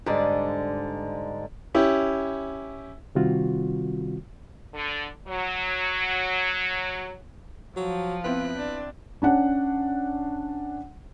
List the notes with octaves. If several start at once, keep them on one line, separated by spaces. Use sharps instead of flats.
G#2 D3 G3 D5
C#4 E4 G4
C3 D#3 G3 C4 F4 F#4
D3
F#3
F3 F#3
B3 C4 E4 B4
D4
C#4 D4 F#5